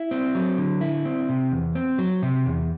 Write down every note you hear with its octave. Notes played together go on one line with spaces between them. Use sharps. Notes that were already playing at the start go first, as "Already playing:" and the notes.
Already playing: E4
C4
F#3
D3
E4
C4
C3
E2
C4
F#3
C3
E2